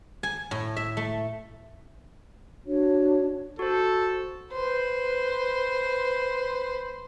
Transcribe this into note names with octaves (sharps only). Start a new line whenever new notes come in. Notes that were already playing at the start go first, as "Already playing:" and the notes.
G#5
A2
E5
A3
D4 F#4 C#5
F#4 A4 C5
B4 C5